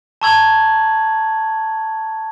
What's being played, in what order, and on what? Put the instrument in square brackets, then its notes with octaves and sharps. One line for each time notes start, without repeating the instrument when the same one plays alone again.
[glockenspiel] A5 A#5 C#6 E6 G#6 F#7